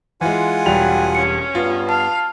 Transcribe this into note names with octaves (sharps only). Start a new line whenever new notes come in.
E3 G#3 F4 F#5 G#5
E1 F#3 G3 G5 F7
C#4 C#7
G2 B3 F4
F5 A5